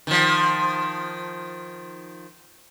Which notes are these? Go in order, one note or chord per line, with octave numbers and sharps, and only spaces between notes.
D#3 F3